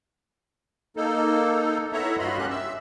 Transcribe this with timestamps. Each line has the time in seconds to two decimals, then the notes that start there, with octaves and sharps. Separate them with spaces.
0.97 A#3 D#4 A4
1.93 B3 E4 A4 C#5 E5 A#5
2.19 G2 F4 F#4 D#5 B5 C6
2.38 A#3 C#4 G4 F#6
2.50 E5 E6